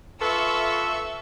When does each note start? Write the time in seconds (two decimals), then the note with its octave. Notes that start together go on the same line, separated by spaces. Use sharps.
0.20 F4 A4 B4 E5 C#6 E6